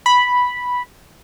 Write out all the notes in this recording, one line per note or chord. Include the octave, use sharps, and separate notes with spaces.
B5